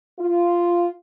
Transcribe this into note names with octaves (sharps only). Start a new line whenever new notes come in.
F4